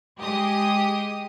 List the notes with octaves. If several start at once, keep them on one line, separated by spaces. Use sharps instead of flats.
G#3 G4 D#6